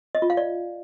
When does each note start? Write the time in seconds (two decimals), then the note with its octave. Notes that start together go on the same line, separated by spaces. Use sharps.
0.15 D#5
0.22 F4
0.30 F5
0.37 D5